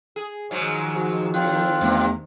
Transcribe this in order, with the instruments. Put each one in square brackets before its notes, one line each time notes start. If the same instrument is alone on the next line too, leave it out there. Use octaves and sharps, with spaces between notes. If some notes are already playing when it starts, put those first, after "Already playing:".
[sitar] G#4
[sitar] G#2 F#3 G#3 [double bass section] D#3 F3
[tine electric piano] F#4
[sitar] A2 [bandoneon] C4 F4 F#6
[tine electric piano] E2 A3 B3 [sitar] G2 C3